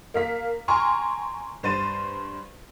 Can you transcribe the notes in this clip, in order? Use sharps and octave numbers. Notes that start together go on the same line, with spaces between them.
A#3 F5 B6
G5 G#5 A#5 C6 C#6 F6
G2 C5 A6 D#7